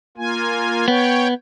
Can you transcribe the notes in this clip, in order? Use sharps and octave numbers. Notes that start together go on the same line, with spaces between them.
A#3 F4 G#5
B3 C#5 G5